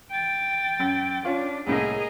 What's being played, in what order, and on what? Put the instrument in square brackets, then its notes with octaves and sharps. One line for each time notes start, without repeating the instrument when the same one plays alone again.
[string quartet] G5 A6
[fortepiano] F#2
[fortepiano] C#4 F4 [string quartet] D4
[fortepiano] C2 A2 A#3 [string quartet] G#4 A#4 D#5